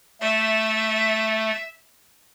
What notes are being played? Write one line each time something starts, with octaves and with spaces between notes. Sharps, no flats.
A3 E5